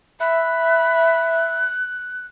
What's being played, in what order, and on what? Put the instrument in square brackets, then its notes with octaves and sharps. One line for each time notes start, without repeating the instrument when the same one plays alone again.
[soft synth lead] E5 [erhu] B5 [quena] F#6